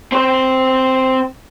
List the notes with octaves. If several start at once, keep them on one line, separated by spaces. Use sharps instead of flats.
C4 C5